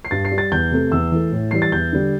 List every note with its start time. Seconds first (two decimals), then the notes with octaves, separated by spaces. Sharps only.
0.05 C7
0.11 G2 A6
0.25 C7
0.32 G3
0.38 A6
0.52 E2 G6
0.71 C3 A3
0.91 E2 E6
1.12 E3 A3
1.32 A2
1.51 E3 G3 C7
1.62 A6
1.72 E2 G6
1.93 D3 G3